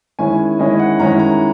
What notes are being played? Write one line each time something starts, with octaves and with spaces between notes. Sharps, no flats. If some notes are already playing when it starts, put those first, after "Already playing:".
D#3 G#3 C#4 E4 G#5
D#3 G#3 C#4 E4 D#5
F#5
D#3 G#3 C#4 E4 A#5
A#5